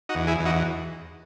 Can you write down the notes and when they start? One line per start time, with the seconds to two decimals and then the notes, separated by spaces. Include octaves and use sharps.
0.09 D#4 F#4
0.15 E2
0.27 E4 G#4
0.40 E2
0.46 D#4 F#4